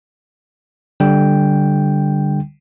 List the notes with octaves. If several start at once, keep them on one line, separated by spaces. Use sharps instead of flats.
D3 G3 G5